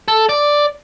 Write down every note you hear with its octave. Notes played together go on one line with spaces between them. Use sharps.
A4
D5